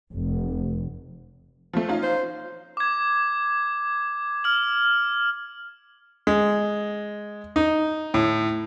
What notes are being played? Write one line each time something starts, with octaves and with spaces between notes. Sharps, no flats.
F1
F3 A3
C#4 D#4 F4
C5
D6 G#6
F6 F#7
G#3
D#4
A2